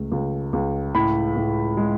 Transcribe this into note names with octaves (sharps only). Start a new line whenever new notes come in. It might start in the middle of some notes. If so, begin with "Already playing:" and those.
Already playing: C#2 A3
C#2
C#2
A2 B5
A2
G#3